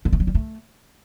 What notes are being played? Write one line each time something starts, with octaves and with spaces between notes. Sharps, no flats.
D3
A3
F#3
G3
A3